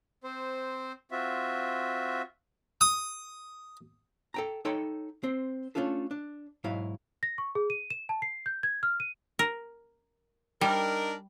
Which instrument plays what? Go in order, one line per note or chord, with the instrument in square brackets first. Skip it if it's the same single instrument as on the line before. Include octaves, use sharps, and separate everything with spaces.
[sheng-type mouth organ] C4 C5
C4 F4 F#4 E5
[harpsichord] D#6
[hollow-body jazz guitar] A4 G5 A#5
D#4 A4 C#5 G5 B5 C6
C4 C5
A3 A#3 C#4 D4 F4 A4
D4
B1 G#2 F#3 E4 F5
[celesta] A#6
C#6
G#4
D#7
E7
A5
C7
G6
G#6
F6
D#7
[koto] A#4
[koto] G3 [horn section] D4 D#4 A#4